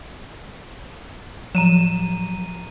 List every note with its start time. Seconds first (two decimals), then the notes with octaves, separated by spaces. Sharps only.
1.55 A2 F3 F#3 A#5 D#7 E7